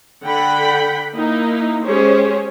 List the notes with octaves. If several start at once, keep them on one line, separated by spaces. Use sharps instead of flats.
D3 F#5 G5 B5
A#3 D#4 E4
G#3 C#4 G4 G#4 C5 C#5